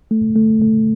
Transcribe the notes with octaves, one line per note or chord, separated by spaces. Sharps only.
A3
A3
A3